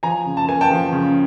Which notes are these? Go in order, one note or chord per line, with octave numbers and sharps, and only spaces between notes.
F3 G#5 A#5
C#3
A5
A#3 G#5
G5 A5
F3
C#3